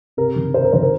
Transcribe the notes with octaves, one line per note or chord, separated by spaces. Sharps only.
C3 A#4
D#3
C3 C5
A#4
D#3 C5
A#4